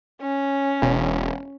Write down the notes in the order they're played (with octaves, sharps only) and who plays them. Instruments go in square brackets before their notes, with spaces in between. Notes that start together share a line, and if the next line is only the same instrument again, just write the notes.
[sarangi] C#4
[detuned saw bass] E1